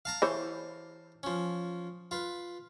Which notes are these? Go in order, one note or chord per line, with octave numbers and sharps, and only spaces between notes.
F5 A5 A#5
E3 C5 C#5
F3 C#4
F4 B4